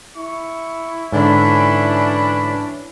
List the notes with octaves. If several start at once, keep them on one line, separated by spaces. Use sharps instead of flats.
E4 C#6
G#2 D3 E3 C#4 D4 B5